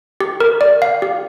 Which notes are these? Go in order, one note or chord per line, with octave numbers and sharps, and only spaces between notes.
G4
A#4
D5
F5
G4